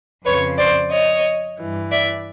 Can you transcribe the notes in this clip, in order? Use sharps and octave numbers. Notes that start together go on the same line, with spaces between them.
F2 C#3 F3 B4 C#5
C5 D5
C#5 D#5
G2 E3
D5 E5